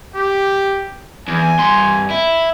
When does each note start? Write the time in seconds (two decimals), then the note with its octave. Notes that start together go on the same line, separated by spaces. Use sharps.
0.16 G4
1.28 E2 G#5
1.60 G2 C6
2.11 E4